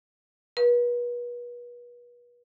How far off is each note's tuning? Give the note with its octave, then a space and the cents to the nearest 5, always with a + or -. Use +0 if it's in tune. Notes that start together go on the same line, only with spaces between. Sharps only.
B4 -35